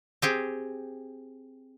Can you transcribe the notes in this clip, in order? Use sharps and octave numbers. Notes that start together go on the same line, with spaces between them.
C4 G4 G#4